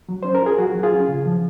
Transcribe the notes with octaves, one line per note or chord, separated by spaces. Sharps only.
F#3
C#4 C5
A#4
F4 G#4
F#3 F#4
F#3
F4 G#4
C#4
C#3
F3